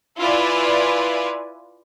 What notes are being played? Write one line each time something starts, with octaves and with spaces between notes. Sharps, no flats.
E4 F4 B4 D5 G#5